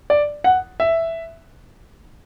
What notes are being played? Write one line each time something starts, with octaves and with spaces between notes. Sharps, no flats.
D5
F#5
E5